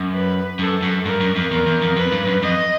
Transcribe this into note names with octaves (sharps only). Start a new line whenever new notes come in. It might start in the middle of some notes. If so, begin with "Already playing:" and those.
Already playing: F#2
B4
F#2 A4
F#2
G2 A#4
F#2
F2
E2 A#4
E2
F2
F2 B4
G2
F#2
F2 D#5